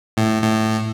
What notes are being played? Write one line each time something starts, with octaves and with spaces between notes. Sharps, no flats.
A2
A2